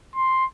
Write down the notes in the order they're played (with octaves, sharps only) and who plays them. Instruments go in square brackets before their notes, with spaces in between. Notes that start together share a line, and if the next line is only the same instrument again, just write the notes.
[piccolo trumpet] C6